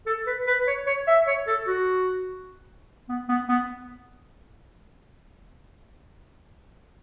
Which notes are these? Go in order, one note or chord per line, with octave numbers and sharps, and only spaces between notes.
A4
B4
B4
C#5
C#5
E5
C#5
A4
F#4
B3
B3
B3